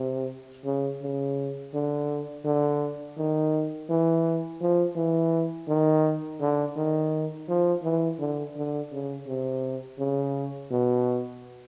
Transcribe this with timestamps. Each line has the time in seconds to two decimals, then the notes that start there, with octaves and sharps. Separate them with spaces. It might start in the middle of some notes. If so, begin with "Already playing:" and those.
Already playing: C3
0.65 C#3
1.02 C#3
1.74 D3
2.45 D3
3.18 D#3
3.89 E3
4.61 F3
4.96 E3
5.68 D#3
6.40 D3
6.76 D#3
7.49 F3
7.83 E3
8.19 D3
8.56 D3
8.92 C#3
9.27 C3
9.99 C#3
10.71 B2